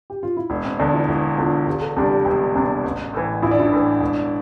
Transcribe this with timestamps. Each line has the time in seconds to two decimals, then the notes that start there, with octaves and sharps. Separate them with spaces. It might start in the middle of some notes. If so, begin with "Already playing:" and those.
0.10 G4
0.23 F4
0.37 E4
0.50 E1 D4
0.64 C4
0.79 E2 D3 D4
0.94 E4
1.08 E1 E4
1.37 E2 D3 F4
1.67 E1 G4
1.82 A4
1.96 E2 C3 G3 D4 G4
2.11 G4
2.25 E1 G4
2.55 E2 C3 G3 D4
2.84 A1
3.13 A2 E3
3.42 A1 E4
3.51 D4
3.59 E4
3.72 A2 E3
4.01 E1